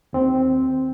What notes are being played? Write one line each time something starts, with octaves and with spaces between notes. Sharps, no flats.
D#2 C4